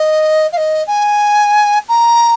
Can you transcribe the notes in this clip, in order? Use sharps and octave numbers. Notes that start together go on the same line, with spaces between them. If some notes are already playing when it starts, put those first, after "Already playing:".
Already playing: D#5
F5
D#5
G#5
A#5